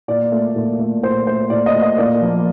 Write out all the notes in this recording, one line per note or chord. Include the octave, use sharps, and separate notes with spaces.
A#2 D5
A3
A#2
A3
A#2 C5
A3 C5
A#2 D5
D#5
A3
D#5
A#2 D5
F3 A#3